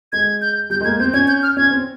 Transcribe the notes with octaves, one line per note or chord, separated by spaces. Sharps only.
G#3 G#6
G6
G3 G6
G#3
A#3 G#6
C4 G6
C#4 G#6
G6
F6
C#4 G#6
C4